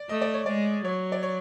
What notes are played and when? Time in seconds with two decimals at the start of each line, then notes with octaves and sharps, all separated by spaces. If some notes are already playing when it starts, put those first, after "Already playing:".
Already playing: D5
0.09 A3 D#5
0.22 D5
0.34 C#5
0.46 G#3 D5
0.85 F#3 C#5
1.12 D5
1.23 C#5